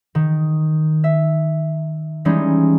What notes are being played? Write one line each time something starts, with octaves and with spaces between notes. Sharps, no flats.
D#3
E5
E3 G3 G#3 C#4 D#4